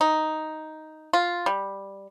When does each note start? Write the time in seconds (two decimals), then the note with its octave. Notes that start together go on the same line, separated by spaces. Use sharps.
0.01 D#4
1.13 F4
1.46 G3